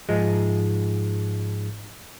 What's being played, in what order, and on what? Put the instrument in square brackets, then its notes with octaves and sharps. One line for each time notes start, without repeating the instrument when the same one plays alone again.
[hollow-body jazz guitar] G#2 F3 G#3